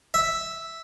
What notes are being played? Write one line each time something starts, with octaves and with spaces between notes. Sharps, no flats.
E5